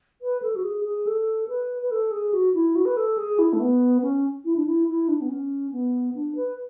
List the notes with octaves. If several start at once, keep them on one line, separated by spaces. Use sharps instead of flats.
B4
A4
F#4
G#4
G#4
A4
B4
B4
A4
G#4
F#4
E4
F#4
B4
A4
G#4
E4
A3
B3
C#4
E4
D4
E4
E4
D4
B3
C#4
B3
D4
B4